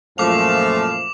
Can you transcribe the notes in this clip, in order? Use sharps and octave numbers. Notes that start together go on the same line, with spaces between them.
F#2 A#2 F3 A3 F5 D6 F7